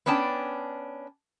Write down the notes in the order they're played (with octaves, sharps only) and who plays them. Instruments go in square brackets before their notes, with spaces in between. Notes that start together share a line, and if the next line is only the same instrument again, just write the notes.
[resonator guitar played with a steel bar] B3 C#4 D4 G5 A5